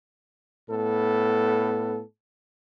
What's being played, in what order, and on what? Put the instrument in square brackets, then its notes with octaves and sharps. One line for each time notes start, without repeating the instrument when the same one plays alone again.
[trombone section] A2 B3 A4